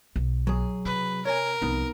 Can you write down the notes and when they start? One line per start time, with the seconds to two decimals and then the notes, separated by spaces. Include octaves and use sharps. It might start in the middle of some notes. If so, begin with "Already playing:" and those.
0.16 B1
0.47 F#3 G#4
0.85 C3 B4
1.25 A#4 C#5 G#5
1.62 C2 F3 B3 D#4